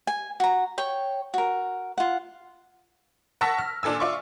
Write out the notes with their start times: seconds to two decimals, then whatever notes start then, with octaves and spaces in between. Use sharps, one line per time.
0.07 G#5
0.40 F#4 A#5
0.78 C#5 G5
1.34 F#4 A#4
1.98 F4 F#5
3.41 F#5 A5 C#6 E6 A#6 B6
3.59 F6
3.83 A#2 D4 A4 G#5 E6
4.00 F4 D5 E5 C6 C#6